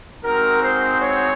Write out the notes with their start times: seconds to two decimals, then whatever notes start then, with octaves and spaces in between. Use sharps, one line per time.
0.23 G#3 C4 D#4 F#4 A#4
0.62 C5
1.00 C#5